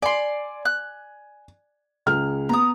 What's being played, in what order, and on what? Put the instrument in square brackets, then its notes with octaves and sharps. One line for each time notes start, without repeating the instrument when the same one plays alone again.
[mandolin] D5 C6 [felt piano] G#5
[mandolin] F#6
[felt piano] C#2 G#4 F6
[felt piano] B3 [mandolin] A#5 D#6